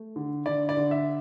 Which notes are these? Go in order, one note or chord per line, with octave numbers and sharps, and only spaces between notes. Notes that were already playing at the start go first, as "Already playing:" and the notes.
Already playing: A3
D3
D3 D5
D5
D3
E5